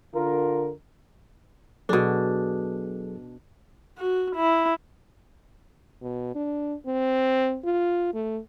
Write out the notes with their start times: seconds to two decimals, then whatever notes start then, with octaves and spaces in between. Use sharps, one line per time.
0.14 D3 F4 A#4
1.89 B2 F#3 D4 G#4 A4
3.98 F#4
4.35 E4
6.02 B2
6.35 D4
6.86 C4
7.65 F4
8.14 A3